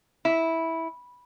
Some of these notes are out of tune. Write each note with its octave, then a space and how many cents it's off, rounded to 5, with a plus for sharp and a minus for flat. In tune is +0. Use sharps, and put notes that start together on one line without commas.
E4 -10